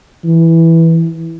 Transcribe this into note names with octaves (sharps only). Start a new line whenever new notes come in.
E3